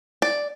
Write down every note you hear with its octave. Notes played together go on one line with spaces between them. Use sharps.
D5